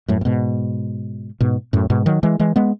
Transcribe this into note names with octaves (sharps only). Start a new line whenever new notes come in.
F#2 A2
A2
G#2 B2
G#2 B2
F#2 A2
G#2 B2
D#3 F#3
E3 G#3
E3 G#3
G#3 B3